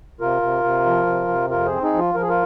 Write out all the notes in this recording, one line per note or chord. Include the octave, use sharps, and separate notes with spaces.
C3 F4 A#4
C3
C3
F3
C3
C3
F2 F4 A#4
G#4 C5
C4
D#4 G#4
F3
F4
F3 A#4
G#4
F4 A#4